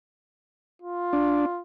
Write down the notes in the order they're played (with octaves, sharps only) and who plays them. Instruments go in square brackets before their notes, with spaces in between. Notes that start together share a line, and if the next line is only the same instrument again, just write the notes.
[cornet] F4
[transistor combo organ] D4